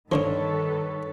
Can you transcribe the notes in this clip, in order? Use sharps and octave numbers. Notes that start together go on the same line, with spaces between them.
G2 A#2 D3 D#3 F3 A4 B4 C#5